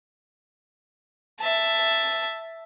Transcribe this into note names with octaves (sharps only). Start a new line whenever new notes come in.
E5 A5